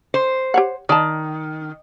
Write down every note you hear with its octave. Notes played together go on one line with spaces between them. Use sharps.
C5
G4 C#5 F#5
D#3 D5 A5